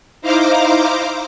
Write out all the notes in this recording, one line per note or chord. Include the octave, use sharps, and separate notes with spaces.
D#4 E4 C5 F5 A#5 D6